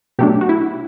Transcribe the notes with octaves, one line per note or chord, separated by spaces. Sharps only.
B2 F#3 A3 D4 G4
F#4
E4